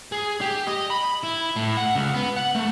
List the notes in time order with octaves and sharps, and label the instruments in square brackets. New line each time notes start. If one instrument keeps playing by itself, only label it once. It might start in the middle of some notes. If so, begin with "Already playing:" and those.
[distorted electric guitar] G#4
G4
D#5
B5
E4
A2
F#5
C#2
B3
F#5
A3